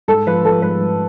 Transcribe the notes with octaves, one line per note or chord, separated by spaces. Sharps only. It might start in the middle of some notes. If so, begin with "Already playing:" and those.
G#2 A4
F3 B4
F3 A4
G#2 B4
G#2